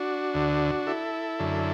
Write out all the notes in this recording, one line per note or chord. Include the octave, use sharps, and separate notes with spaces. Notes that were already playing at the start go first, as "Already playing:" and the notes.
Already playing: D4 F#4
D2 D3
E4 A4
F#2 D3